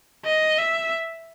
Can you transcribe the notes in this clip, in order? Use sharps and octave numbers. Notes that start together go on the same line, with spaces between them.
D#5
E5